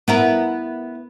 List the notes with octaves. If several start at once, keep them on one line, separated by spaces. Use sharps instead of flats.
B3 E4 A#4